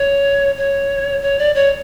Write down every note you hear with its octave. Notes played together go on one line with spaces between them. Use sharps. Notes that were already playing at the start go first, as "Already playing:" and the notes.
Already playing: C#5
C#5
C#5
D5
C#5